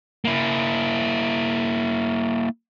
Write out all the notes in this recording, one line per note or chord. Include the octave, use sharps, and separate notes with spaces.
A#3 E4